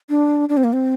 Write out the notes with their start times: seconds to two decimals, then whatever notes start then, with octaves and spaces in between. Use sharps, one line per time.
0.09 D4
0.49 D4
0.57 C4
0.64 A#3
0.73 C4